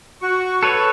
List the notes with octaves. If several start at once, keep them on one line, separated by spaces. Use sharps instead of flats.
F#4 C#6
A4 B4 C#5